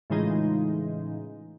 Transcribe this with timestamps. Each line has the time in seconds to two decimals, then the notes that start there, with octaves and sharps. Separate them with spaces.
0.10 A2 C#3 E3 G#3 D#4 F4